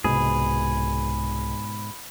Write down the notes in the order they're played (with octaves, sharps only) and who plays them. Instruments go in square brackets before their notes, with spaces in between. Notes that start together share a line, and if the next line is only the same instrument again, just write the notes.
[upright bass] C2 [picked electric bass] G#2 B2 [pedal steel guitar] G#4 [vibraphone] B5